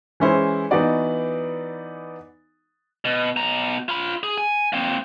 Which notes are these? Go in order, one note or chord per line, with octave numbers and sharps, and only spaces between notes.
E3 G#3 C#4 E4 C5
E3 B3 D#4 F#4 D5
B2
B2 A#5
F4 B5
G#4
G#5
A#3 C4